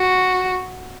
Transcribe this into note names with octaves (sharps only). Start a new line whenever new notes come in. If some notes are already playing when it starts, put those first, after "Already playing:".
Already playing: F#4